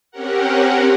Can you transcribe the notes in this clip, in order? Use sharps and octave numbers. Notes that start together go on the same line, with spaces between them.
C4 C#4 G4 A#4 F#5